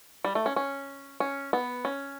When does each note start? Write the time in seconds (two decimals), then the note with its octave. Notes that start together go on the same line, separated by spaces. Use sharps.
0.24 G3
0.35 A3
0.46 C#4
0.56 C#4
1.20 C#4
1.53 B3
1.85 C#4